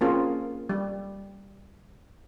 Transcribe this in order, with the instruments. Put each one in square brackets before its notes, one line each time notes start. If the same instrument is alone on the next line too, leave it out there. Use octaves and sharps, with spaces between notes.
[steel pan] A#3 C4 C#4 F4 G#4 A#4
G3